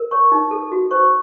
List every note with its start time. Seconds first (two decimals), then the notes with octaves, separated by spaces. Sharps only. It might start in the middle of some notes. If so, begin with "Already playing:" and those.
Already playing: A#4
0.11 C#5 C#6
0.32 D#4
0.51 A4
0.72 F#4
0.91 C5 C#6